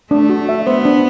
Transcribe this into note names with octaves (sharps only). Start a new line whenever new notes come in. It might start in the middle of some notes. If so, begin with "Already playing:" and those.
A3 D4
F#4
E5
B3 C5
D4